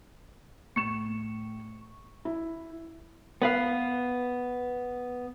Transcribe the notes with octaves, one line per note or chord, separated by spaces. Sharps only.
A2 C#6 C#7 E7
E4
B3 B4 F5